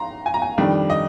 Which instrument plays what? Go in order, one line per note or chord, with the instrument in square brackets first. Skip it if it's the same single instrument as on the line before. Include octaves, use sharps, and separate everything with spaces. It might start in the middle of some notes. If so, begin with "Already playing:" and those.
Already playing: [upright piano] A#5 C6
G#5
A#5
G#5
F2 D#3 G3 D4
D#5